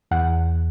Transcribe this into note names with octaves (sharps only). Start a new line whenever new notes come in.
E2 F#5